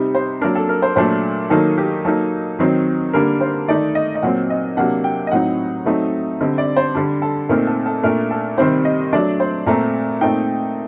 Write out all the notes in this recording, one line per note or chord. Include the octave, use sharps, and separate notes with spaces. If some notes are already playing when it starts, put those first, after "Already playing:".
Already playing: C3 G3 C4 D#4
C5
F#3 A#3 D4 A#4
A4
A#4
C5
A#2 F#3 A3 D4 C5
D#3 F#3 A#3 D#4 A4
G4
F#3 A#3 D#4 A4
D#3 F#3 C4 D#4
D3 G3 A#3 D4 A#4
C5
D#3 A3 D#4 D5
D#5
D#5
A#2 F#3 C4 F#5
D#5
C3 F#3 A#3 D4 F#5
G5
D#5
A2 F#3 C4 D#4 F#5
F#3 A3 C4 D#4
D3 G3 C4 D#5
D5
C5
D3 G3 D4
A4
A#2 A3 C4 D#4 A#4
A4
A4
A#2 A3 D4 A#4
A4
C3 D#3 G3 C4 D#4 C5
D#5
F#3 A3 D4 D5
C5
A#2 A3 C4 A#5
A#2 A3 C4 D#4 G5